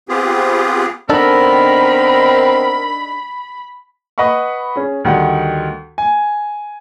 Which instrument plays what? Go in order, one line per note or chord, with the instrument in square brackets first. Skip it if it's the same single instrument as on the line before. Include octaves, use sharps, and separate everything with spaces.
[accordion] B3 C4 F4 G4 G#4
[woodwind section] D#3 B3 A#4 [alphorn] C4 [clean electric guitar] D4 D#4 A4 [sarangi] B5
[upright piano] B4 D#5 F#5 B5 C#6
C#4 G#4
D2 D#3 G3 F#5
G#5